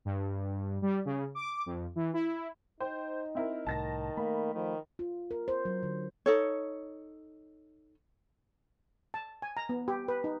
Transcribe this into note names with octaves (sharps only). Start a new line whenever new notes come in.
G2
G3
C#3
D6
F2
E3
E4
D#4 C5 G5
C4 E4 A#4
C2 A2 D#3 A5 A6 A#6
A3 A#3 B5
D#3 F3
F4
A#4
C5
F#3
D3
D#4 A4 C#5
A5
G#5
A#5
B3
G4
B4
D#4